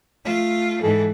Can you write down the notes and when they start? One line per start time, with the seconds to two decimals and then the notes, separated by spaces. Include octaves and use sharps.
0.24 A3 F4
0.82 G#2 E3 A4